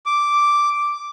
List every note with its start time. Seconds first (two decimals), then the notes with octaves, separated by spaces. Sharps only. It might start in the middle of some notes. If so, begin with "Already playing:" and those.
0.06 D6